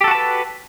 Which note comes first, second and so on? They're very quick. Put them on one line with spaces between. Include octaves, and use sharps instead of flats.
G4 A4 F#4 A5 B4